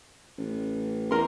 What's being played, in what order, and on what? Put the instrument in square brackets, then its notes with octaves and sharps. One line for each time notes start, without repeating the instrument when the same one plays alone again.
[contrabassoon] A1
[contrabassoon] E2 [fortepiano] A#4 C6